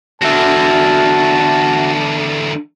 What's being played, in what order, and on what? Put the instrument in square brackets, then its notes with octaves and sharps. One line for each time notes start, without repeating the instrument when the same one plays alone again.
[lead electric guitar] E2 D3 [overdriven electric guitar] F#4 E5 [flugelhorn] A5